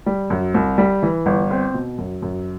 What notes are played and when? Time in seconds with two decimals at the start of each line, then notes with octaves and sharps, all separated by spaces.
0.06 G3
0.30 F#2
0.54 C2
0.78 G3
1.03 E3
1.26 G1
1.51 C4
1.74 B2
1.98 F#2
2.22 F#2